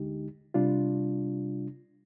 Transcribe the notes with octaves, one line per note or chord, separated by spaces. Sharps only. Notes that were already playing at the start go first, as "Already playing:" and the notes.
Already playing: D2 D3 G#3 D#4 G4
C3 G3 D4 F4